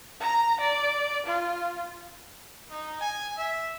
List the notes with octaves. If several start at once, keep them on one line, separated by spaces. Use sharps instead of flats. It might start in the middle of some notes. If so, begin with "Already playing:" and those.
A#5
D5
F4
D#4
G#5
E5